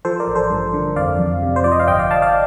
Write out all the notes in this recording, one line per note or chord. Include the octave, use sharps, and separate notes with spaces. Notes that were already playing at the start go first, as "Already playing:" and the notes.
F3 A4 C5
A#4 D5
A1
A4 C5
G2
D3
F2 D5 F5
F2
C3
C5
F3 D5
D#5
F5
G1 D#5 G5
D5 F5
G1 F5 A5
D5 F5